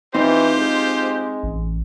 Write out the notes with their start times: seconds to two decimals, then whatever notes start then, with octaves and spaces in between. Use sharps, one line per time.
0.15 E3 C4 D#4 F4 G4 C5
0.59 G#3
1.43 A1